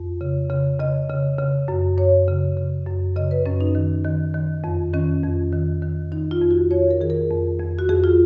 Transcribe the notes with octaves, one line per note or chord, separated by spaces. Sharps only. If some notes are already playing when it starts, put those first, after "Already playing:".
Already playing: F2
C#3
C#3
C#3 D#5
C#3
C#3
F#2
F#2 C#5
C#3
C#3
F#2
C#3 D#5
B4
F#2 C#4
D#4
D#3
D#3
D#3
F2
D#3 C#4
F2
D#3
D#3
D#3 D#4
F4
F2
F#4
F2 C#5
A#4
D#3 G#4
A#4
F2
F2
F#4
F2 G#4
F4